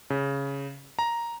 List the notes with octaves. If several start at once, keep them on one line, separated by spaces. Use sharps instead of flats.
C#3
A#5